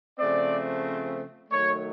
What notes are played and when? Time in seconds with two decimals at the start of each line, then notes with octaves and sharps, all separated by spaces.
0.18 C#3 F3 A3 C4 D5
1.51 D#3 F#3 A3 C#5